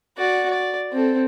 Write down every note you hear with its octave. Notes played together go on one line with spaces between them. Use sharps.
F#4 D5
D5
C4 A4